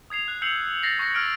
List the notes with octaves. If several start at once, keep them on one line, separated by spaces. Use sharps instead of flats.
D#6 G#6 C7 F7
F#6
E6 G6 C7 C#7 F7 F#7
A6 A#6 C7
C#6 G6 A#6 C#7
E6 F6 G#6 D7